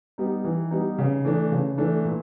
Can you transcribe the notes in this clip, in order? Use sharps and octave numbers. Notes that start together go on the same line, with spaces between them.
G3 B3 D#4
E3
G3 B3 D#4
C#3
E3 A3 D4
C#3
E3 A3 D4
A#2